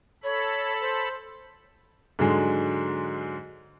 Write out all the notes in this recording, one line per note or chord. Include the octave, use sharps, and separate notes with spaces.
A4 C#5 B5
C5
G#2 D3 F#3 G#3